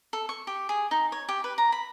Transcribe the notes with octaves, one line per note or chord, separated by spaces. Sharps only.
A4
C#6
G4
G#4
D#4
C#5
G4
B4
A#5
B5